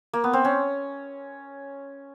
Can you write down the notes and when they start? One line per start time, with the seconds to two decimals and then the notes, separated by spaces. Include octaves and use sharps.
0.13 A#3
0.24 B3
0.33 C4
0.45 C#4